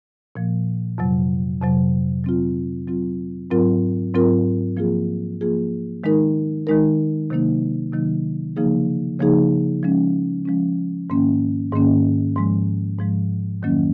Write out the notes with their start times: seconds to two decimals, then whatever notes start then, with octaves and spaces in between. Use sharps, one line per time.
0.36 A#2 F3 A#3
0.98 F2 C3 F#3
1.61 F2 C3 F#3
2.24 F#3 C4 F4
2.87 F#3 C4 F4
3.50 G#2 F#3 C4 F4 A#4
4.14 G#2 F#3 C4 F4 A#4
4.77 F3 A#3 F4 G#4
5.41 F3 A#3 F4 G#4
6.04 D#3 G#3 D#4 A#4
6.67 D#3 G#3 D#4 A#4
7.30 C3 D#3 F#3 A#3 D#4
7.93 C3 D#3 F#3 A#3 D#4
8.56 C#3 F3 A#3 D#4 G#4
9.20 C#3 F3 A#3 D#4 G#4
9.83 F3 G#3 C#4
10.46 F3 G#3 C#4
11.10 G#2 D#3 A#3 C#4
11.72 G#2 D#3 A#3 C#4
12.36 G#2 F3 G#3
12.99 G#2 F3 G#3
13.62 F2 D#3 F#3 A#3 C#4